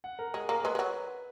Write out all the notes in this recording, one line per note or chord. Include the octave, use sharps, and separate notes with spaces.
F#5
A#4
G#3 G#4
A#3 A#4
G#3 B4
G#3
F#3